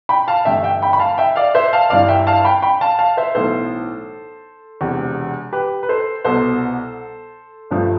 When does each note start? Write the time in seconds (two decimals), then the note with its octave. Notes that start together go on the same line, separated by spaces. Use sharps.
0.09 G5 B5
0.28 F5 A5
0.45 A1 G2 D3 E5 G5
0.63 E5 G5
0.82 G5 B5
0.93 B5
0.99 F5 A5
1.18 E5 G5
1.36 D5 F5
1.55 C5 E5
1.73 F5 A5
1.90 G1 G2 E3 D5 F5
2.08 E5 G5
2.27 F5 A5
2.44 G5 B5
2.62 G5 B5
2.81 F5 A5
2.99 F5 A5
3.17 C5 E5
3.35 B1 A2 E3 B3 A4 C5
4.81 E1 E2 C3
5.53 G4 B4
5.83 B4
5.89 A4 C5
6.25 C2 B2 B3 A4 C5
7.71 G1 G2 F3 A3